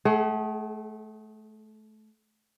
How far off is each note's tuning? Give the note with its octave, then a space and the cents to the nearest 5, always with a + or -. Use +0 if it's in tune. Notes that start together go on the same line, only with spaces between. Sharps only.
A3 -25 G#4 +20 F#5 +40